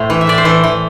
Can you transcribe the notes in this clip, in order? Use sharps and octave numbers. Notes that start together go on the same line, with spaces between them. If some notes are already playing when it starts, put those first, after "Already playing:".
Already playing: A2 A3 C5
E3
E5
A2 D5
C5
E3 A4
E3